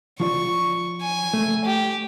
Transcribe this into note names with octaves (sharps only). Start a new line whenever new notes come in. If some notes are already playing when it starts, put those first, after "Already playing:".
F3 F4 D5 C#6
G#5
A3
G4